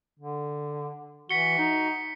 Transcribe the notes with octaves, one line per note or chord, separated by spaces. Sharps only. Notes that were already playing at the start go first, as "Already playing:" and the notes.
D3
E3 F#4 B6 C#7 G7
D#4